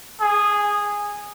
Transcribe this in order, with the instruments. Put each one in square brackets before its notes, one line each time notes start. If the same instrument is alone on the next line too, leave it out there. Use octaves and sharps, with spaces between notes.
[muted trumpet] G#4